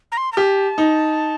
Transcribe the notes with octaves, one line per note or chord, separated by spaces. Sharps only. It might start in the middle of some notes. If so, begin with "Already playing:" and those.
A#5
C6
A#5
G4 A5
D#4